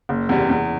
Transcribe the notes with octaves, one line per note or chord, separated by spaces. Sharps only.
F#1
E2 C3 G3
E2